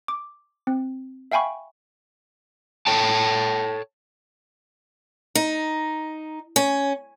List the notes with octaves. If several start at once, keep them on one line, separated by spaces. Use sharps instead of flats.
D6
C4
E5 F5 G5 G#5 B5 C#6
A4 C#5 G5 A5
D#4
C#4